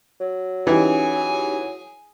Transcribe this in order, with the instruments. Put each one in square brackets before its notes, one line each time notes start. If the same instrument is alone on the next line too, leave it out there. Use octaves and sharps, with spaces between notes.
[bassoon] F#3
[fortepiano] E3 [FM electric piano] C#4 D#4 G4 [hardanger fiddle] G#4 G#5